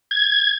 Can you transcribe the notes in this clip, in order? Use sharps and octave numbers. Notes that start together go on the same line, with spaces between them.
G#6